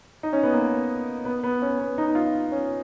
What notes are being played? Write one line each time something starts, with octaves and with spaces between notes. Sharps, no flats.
D#4
C#4
B3
A#3
B3
B3
C#4
B3
D#4
F4
C#4